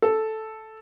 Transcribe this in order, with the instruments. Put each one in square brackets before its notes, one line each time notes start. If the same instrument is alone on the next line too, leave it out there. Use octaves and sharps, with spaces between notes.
[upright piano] A4